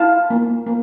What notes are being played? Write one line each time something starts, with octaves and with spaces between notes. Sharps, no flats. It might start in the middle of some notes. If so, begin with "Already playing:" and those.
Already playing: E4 F5 A5
A#3
A#3